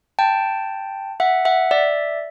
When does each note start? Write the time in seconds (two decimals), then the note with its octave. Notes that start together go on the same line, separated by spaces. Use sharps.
0.19 G5 A5
1.20 E5 F#5
1.45 E5 F#5
1.71 D5 E5